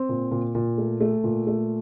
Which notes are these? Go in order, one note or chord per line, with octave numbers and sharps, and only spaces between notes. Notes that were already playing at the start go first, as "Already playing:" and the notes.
Already playing: C4
A#2
A#2
A#2
A3
A3
A#2
A3